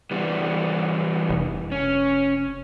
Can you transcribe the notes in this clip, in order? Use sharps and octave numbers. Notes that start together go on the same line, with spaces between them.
E3 G3 B3
F1
C#4